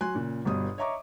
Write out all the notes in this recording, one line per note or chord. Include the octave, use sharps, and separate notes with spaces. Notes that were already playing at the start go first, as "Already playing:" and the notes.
F#3 G#5 C6 F#6
A#2 C#3
G1 G2 B2 D#6
C#5 D#5 E5 A#5 C#6 D6